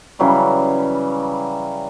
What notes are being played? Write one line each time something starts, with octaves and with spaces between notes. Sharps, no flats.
C#3 E3 F#3 G3